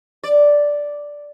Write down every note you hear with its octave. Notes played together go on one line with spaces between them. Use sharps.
D5